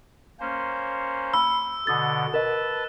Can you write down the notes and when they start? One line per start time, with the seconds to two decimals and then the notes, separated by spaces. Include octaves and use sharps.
0.40 A#3 C#4 C5
1.34 B5 E6
1.87 B2 D3 D#6 A6
2.34 A#4 B4 D#5 A5